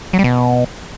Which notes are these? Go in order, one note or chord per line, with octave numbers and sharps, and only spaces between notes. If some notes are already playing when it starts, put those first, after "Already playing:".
F#3
G3
B2